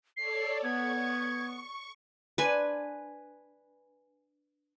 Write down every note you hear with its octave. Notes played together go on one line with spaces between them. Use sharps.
A4 C#5 D5 C7
B3 C#6 G#6
D4 B4 C5 G#5